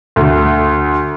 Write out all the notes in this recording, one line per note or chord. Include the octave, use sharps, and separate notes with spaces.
D2